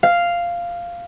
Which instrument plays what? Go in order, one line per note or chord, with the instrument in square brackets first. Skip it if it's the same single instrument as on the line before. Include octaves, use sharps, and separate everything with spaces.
[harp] F5